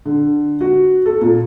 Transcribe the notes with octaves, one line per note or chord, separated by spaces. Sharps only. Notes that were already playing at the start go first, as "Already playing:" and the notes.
D3
F#4
A4
A#2